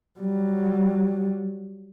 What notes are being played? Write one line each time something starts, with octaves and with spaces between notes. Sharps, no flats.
F#3 G3